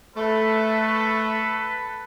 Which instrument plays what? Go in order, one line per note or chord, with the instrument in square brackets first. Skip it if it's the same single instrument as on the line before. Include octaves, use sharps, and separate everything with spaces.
[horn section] A3 [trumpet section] A4 B4